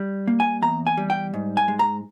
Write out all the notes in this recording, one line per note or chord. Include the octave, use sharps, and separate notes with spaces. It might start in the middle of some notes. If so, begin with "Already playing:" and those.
Already playing: G3
A#3
G#5
E2 A#5
G#5
G3
G5
G#2
G#5
G#3
A#5